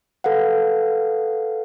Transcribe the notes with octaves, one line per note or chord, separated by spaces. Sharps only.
A4 B4 F5 F#5